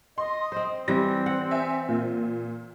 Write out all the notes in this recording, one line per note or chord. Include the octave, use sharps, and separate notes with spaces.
D#5 C6
C4 C5
E3 G3 C4 A#6
F#5
E5 G#5
A#2